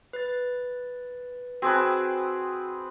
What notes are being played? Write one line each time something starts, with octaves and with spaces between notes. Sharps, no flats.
B4 A6
C4 F#4 G#4 B4 G5 A5